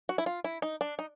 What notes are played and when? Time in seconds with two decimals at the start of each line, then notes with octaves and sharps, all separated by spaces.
0.09 F#4
0.18 E4
0.26 F4
0.44 E4
0.62 D#4
0.81 D4
0.99 D#4